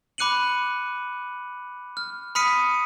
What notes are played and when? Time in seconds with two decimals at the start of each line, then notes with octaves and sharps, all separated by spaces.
0.18 B5 D6 F#6 C#7 D#7 F#7
1.97 F6
2.35 B5 D#6 F6 B6 C#7 D#7